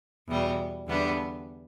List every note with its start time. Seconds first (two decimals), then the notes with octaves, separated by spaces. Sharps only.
0.28 E2 B2 G3
0.88 E2 D3 G3 B3 D4